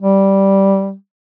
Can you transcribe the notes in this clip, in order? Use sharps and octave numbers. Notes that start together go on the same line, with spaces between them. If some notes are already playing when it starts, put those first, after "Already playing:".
G3